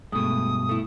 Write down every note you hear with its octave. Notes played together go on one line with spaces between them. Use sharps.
G2 B2 G#3 A3 D#6
A3 E4